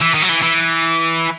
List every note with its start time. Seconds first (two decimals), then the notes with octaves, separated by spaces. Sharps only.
0.01 E3
0.14 D#3
0.22 F#3
0.29 E3
0.43 E3